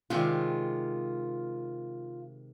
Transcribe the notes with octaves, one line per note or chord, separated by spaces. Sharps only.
C3 D#3 G#3 F4